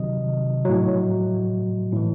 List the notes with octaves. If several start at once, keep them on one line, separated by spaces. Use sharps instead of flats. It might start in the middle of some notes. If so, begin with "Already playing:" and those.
Already playing: C3 D#3 F#3 D#5
A2 F#3
A2 E3